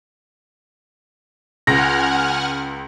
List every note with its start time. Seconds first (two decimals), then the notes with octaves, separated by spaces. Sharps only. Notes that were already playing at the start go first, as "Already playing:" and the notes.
1.67 C#2 F#5 G#5 F6 A#6